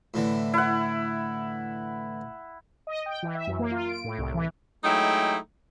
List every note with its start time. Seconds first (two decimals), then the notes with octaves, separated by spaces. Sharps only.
0.14 A2 D3 E3
0.54 E4 F#5
2.87 D#5
3.06 G5
3.23 E3
3.35 E5
3.47 F#2
3.59 A#3
3.71 F4
3.89 D7
4.04 A2
4.18 C2
4.34 E3
4.84 F#3 G#3 A3 D#4 E4 G5